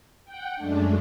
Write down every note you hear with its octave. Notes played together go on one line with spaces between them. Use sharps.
F#5 G5
F#2 G#3 A3 D4